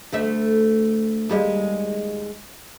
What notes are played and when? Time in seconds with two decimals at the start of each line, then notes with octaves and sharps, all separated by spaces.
0.12 D2 A3 E5
1.29 D#2 G3 G#3